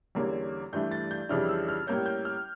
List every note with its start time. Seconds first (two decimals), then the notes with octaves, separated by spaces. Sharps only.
0.15 E2 D3 G3 A#3 C#4
0.72 G2 E3 A3 D4 G6
0.91 A6
1.11 G6
1.29 F2 C#3 E3 G3 D4 F6
1.49 E6
1.69 F6
1.87 A2 G3 A#3 C#4 G6
2.06 G6
2.25 F6